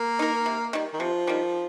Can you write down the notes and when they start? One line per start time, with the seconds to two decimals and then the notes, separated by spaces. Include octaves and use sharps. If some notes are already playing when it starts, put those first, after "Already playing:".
Already playing: A#3
0.19 D#4 A#4
0.46 C3
0.73 D#3 G3
0.94 D#3
1.00 C3 F3
1.27 D#3 G3